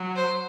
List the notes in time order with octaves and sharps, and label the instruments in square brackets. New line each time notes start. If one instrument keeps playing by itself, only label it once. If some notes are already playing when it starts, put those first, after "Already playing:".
Already playing: [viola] F#3
[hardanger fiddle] C5